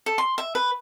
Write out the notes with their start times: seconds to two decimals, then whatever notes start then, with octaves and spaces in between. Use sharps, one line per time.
0.06 A4
0.18 C6
0.38 E5
0.55 B4